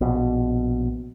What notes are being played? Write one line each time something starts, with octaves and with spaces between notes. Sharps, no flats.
A#1 B2